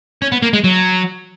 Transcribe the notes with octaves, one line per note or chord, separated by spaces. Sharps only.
C#4
B3
A#3
G#3
F#3